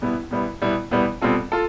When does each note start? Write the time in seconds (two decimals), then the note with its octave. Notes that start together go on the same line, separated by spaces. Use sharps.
0.02 B2 G3 B3 E4
0.31 B2 G3 B3 E4
0.62 B2 G3 B3 E4
0.91 B2 G3 B3 E4
1.22 B2 G3 C4 F4 A4
1.52 F4 A4